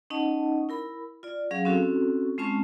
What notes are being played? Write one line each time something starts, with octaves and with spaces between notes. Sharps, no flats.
C#4 D#4 D#5 F#5 A5
E4 A#4 B5
F4 D5
F#3 C#4 G#4 F5
C4 C#4 E4 F#4 A4
G#3 C4 C#4 F4 A5 C#6